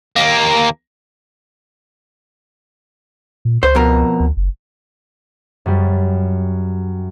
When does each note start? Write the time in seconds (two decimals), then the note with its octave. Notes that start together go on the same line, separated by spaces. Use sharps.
0.16 D#2 A#3
3.45 A#2
3.63 C#2 C5
3.75 F2 B2 A#4
4.20 D2
4.37 F#1
5.66 F#2 G3